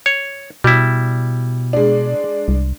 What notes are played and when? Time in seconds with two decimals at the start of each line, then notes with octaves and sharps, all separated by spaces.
0.06 C#5
0.64 B2 G3 E4
1.73 G#3 D4
2.48 C2